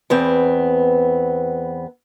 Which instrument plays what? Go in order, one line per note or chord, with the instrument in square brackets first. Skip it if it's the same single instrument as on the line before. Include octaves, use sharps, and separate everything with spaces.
[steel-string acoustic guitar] E2 B3 C4